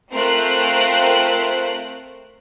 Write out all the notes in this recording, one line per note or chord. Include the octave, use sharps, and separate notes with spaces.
A3 C4 F4 A#4 C5 F#6